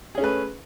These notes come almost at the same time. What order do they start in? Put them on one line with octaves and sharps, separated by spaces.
G#4 C#4 A3 B4